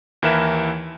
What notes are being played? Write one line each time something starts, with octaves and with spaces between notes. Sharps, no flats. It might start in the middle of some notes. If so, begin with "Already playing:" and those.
D#2 E3 E4 A#4 E5 E7